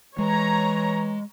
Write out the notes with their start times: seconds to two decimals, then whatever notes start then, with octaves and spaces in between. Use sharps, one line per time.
0.19 E3 G#3 C#5 A#5